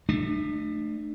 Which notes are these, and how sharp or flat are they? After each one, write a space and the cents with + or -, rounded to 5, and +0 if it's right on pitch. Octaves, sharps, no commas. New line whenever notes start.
A3 +0 D4 +40